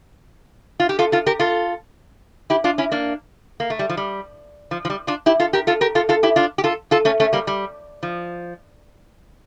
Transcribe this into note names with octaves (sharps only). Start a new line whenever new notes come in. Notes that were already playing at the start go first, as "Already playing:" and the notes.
F4
G4
F4 A4
F4 A4
G4 A#4
F4 A4
E4 G4
D4 F4
C#4 E4
A#3 D4
A#3
A3
G3
F3
G3
F3
F3
G3
D4 F4
E4 G4
F4 A4
G4 A#4
F4 A4
G4 A#4
F4 A4
F4 A4
E4 G4
D4 F4
G4
F4 A4
F4 A4
A3 C#4
A3 C#4
G3 A#3
G3
F3